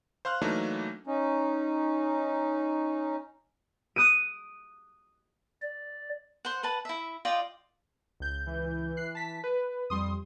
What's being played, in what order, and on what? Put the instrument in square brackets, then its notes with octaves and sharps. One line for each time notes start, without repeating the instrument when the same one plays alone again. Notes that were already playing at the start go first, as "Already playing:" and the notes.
[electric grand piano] C5 F5 C6 F6 F#6
E3 F#3 A3 A#3 D4 D#4
[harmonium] C#4 D#4
[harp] D#6 F#6 D7 D#7
[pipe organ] D5
[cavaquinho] C5 F#5
B4 F#5 A5
E4 E5
F4 D5 D#5 G5
[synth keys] C#2 G6
[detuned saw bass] E3
[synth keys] F#6 C7
A5 B6
B4
[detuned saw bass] F2 [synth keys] G3 C6 D#6